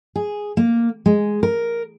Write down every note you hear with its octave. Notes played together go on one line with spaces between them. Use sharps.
G#4
A#3
G#3
A#4